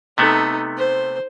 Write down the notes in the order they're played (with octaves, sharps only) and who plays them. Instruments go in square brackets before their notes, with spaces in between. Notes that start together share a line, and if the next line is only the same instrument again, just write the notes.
[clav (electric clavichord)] C3 A3 B3 [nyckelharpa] D#4 A4
[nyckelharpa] C5